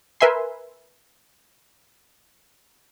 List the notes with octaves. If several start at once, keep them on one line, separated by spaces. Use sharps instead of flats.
A#4 B4 E5 G#5 C6